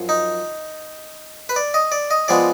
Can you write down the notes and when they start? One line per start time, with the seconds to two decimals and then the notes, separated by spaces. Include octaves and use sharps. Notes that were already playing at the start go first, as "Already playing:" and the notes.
Already playing: F#2 F3
0.09 D#4
1.49 B4
1.56 D5
1.74 D#5
1.92 D5
2.11 D#5
2.28 F3 G#3 B3 D5